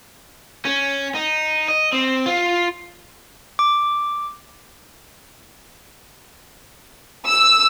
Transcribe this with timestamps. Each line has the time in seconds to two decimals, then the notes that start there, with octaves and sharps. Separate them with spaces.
0.65 C#4
1.15 D#4
1.68 D#5
1.93 C4
2.26 F4
3.59 D6
7.26 E6